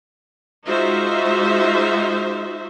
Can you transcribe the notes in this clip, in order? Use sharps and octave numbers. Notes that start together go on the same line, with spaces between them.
G#3 D#4 F4 F#4 C5 E5